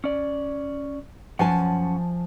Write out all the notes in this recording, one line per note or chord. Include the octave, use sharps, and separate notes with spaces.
C#4 D5
F#2 F3 C#4 F#5 G#5 A5